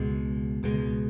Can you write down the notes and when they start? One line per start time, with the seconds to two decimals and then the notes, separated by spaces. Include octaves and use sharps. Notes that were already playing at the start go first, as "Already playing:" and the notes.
Already playing: C#2 B2 G#3
0.63 C#2 B2 G#3